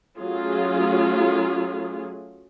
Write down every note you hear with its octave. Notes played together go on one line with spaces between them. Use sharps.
F#3 A3 C#4 F4 G#4